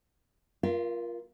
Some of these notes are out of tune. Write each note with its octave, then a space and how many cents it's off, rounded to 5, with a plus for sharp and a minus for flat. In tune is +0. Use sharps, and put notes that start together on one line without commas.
F4 +0 A#4 +25 F5 -45